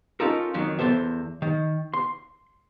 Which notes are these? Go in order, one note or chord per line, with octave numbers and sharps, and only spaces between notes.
C#4 D#4 F4 A4 A#4
F2 D#3 F#3
E2 C#3 A4 C5 E5
D#3
C6